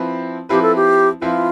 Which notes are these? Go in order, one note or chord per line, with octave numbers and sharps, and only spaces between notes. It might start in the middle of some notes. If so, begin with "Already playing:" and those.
Already playing: F3 C4 E4 B4
F3 C4 E4 G4 B4
A4
G4
F3 C4 E4 F4 B4